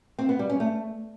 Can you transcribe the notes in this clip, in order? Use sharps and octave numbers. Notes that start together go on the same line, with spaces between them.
C4
B3
G3
C#4
A3